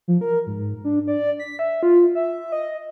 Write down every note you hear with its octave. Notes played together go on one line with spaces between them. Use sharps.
F3
A#4
G#2
D4
D5
B6
E5
F4
E5
D#5